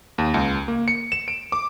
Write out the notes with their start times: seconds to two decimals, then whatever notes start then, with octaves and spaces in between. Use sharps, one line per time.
0.18 D#2
0.34 C#2
0.68 A#3
0.88 C#7
1.12 E7
1.28 D7
1.52 D6